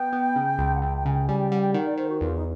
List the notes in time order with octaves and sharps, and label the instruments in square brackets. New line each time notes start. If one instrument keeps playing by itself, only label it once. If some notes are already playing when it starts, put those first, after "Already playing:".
Already playing: [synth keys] B3 [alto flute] G5
[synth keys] B3
C#3
C#2
[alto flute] F#5
[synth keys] C#2 [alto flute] G5
[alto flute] G5
[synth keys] C#3 [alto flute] G#5
[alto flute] G5
[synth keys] G3 [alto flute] G#5
[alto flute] G5
[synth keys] G3 [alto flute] F#5
[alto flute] G5
[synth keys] D#3 [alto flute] F#5
[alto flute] D5
[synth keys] D#3 [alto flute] C5
[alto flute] F#4
[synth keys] E2 [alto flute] F4
[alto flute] D#4